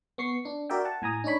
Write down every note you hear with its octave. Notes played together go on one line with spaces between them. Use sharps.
B3 C#6 C7
D4
F#4 A#4 D5 E5 G5
F#5 A5
A2 G#5 A#5 D#6
D4 D#4 C#5 B5